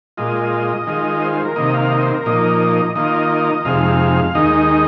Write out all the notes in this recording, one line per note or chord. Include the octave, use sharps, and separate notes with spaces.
A#2 G#3 F4 D#5
D#3 G#3 F4
C5
C5
A#4
C3 D#3 A#3 D#5
F5
D#5
C5
A#4
A#2 F3 A#3 D#4 D#5
D#3 A#3 F4 D#5
F2 C3 G#3 D#4 F5
D#2 D#3 G#3 D#4 D#5